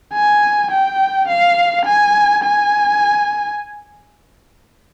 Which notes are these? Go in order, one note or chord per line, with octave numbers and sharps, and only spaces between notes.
G#5
G5
F5
G#5
G#5